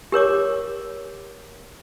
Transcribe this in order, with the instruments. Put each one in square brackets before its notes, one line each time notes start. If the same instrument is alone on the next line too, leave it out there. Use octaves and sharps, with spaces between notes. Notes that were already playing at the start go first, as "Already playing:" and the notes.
[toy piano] G4 A#4 C#5 D6